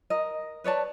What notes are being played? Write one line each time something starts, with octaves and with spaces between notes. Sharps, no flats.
A#4 D#5
B4 C#5 D5 A5